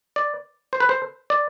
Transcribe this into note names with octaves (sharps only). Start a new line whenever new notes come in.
D5
C5
B4
C5
D5